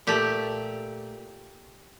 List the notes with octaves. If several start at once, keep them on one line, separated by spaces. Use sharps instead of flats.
A#2 A3 G4